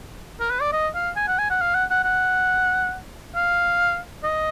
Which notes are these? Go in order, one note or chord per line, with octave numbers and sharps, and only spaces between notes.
A#4
B4
D5
D#5
F5
G#5
F#5
G#5
F#5
F5
F#5
F#5
F#5
F5
D#5